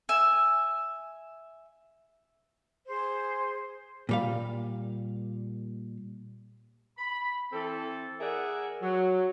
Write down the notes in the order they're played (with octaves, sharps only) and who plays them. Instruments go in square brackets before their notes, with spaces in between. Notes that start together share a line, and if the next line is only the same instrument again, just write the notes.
[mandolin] E5 G#5
[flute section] G#4 C5
[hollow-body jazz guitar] A#2 G3 F5
[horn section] B5
E3 C4 A4
G#4 A#4 D5 E5 F#5
F#3